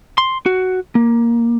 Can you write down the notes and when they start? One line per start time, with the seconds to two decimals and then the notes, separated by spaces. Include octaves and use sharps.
0.18 C6
0.46 F#4
0.95 A#3